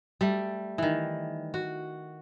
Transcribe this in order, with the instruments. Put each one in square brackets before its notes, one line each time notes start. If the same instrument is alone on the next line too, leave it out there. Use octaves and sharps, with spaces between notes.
[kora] G3 A3
D#3 E3
F#4